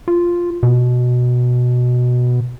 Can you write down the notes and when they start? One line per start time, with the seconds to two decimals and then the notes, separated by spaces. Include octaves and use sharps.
0.08 F4
0.63 B2